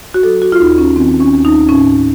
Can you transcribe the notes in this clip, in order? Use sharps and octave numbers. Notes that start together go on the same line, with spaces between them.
F#4
F#3 A4
F#4
F4
D#2 D#4
C#4
D#3 C4
C#4
D#2
D#4
A2 C#4